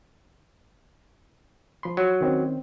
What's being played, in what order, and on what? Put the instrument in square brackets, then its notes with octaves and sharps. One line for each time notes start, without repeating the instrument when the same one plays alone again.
[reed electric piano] F3 B5 C6
[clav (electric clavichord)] F#3
[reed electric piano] D#3 C4 C#4